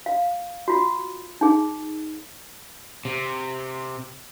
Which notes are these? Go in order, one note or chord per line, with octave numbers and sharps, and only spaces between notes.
F5
F4 F#4
D#4 G#4
C3